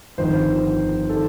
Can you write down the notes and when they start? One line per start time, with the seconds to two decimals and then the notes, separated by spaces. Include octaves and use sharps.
0.18 G1 F2 D#3 C5
1.09 D#3 A4